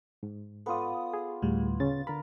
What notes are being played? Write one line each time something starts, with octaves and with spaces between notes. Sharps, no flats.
G#2
B3 F4 A4 D5 D#6
G#4
D2 A2 G3
C#3 C#4 A6
D3 A#4 B5